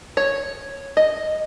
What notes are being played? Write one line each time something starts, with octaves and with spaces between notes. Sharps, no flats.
C#5
D#5